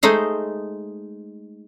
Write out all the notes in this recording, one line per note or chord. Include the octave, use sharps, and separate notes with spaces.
G#3 A3 D#4 C5